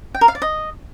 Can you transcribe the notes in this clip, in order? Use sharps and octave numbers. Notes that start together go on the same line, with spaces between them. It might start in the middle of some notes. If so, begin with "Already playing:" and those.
G5
A#4
F5
D5
D#5